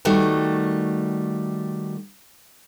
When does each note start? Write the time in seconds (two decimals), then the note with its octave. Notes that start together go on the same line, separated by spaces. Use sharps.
0.05 D#3 G3 A3 F#4